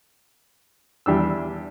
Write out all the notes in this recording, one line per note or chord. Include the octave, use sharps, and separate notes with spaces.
E2 G3 D4 E6